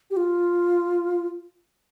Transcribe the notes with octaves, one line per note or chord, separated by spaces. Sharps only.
G4
F4